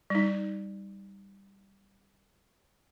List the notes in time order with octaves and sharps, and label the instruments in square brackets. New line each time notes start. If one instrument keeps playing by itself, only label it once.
[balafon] G3 D#4